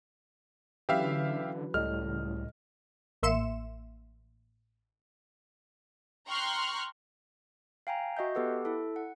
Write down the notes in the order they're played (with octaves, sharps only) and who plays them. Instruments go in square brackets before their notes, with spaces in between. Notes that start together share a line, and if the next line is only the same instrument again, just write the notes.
[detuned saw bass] D3 [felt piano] E3 F#3 C#4 [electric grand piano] G4 E5 F5 [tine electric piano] B4
[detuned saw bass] C#2 [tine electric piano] A2 G3 [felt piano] A4 D#5 [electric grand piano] F6
[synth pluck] A1 A#3 E5 C6 C#7 E7
[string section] G5 A#5 C6 C#6 F6 F#6
[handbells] F5 G5 G#5 A#5
F#4 D#5 E5 G6
B3 G4 A4 B4 F#5
E4 A4
F#5